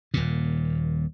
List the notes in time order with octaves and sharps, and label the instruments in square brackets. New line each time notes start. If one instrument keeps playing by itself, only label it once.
[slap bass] D#1 A#2